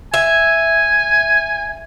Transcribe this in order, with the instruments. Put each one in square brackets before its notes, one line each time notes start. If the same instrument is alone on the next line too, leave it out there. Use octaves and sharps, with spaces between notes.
[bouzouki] E5 [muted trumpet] G#5